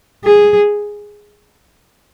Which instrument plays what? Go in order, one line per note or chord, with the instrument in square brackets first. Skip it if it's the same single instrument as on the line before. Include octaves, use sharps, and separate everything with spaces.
[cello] G#4